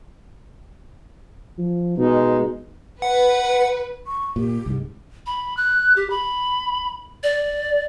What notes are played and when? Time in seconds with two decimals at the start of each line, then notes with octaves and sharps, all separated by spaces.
1.58 F3
1.98 B2 G#3 D#4
3.02 B4 F#5
4.07 C#6
4.36 A#2 G4
4.66 C2 G#2
5.26 B5
5.57 F#6
5.96 G4
6.10 B5
7.23 D5